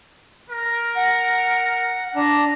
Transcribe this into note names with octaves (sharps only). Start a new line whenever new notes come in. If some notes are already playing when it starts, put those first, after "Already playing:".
A#4
F#5
D4 A#5